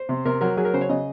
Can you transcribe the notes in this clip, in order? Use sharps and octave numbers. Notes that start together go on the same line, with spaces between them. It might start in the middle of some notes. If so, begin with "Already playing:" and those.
Already playing: C5
C3
C3 A#4
F#3 A#4
F#3 G#4
A#4
C#3 C5
C#5
C#3 D#5